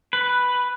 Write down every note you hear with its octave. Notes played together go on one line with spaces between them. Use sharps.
B4